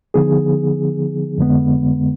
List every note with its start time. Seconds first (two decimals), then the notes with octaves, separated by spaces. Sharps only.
0.14 D3 F3 B3 D#4 G#4
1.38 F2 D3 G#3 B3